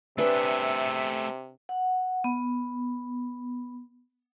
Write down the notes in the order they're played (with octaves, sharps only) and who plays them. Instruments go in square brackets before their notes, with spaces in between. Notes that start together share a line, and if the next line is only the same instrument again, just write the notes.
[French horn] C3 [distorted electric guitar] A3 G#4 [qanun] D4 B4 [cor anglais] E5
[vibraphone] F#5
B3